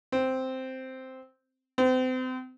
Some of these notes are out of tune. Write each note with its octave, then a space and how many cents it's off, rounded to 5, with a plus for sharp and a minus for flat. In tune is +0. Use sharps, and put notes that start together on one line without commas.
C4 -5
C4 -35